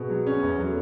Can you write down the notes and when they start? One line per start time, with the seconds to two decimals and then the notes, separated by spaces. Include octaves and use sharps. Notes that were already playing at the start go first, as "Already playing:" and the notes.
Already playing: B2 G#4 B4
0.10 F#3
0.27 C#4
0.43 E2
0.58 F#3 A4 C#5